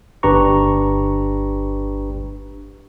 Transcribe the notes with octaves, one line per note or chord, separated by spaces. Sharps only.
G1 D4 G4 B4 A#5 C#6